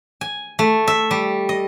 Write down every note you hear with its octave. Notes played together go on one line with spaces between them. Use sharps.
G#5
A3
E5
G3
D#5